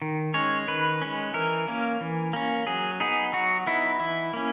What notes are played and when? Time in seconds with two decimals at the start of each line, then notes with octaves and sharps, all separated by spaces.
0.02 D#3
0.34 G#3 C#4 C#5
0.68 D#3 B4
1.02 G#3 C#4
1.34 E3 A#4
1.68 A#3 C#4
2.01 E3
2.33 A#3 C#4
2.67 F#3 G#4
3.00 B3 D#4 G#4
3.33 F#3 F#4
3.67 B3 D#4 E4
4.00 E3 E4
4.33 A#3 C#4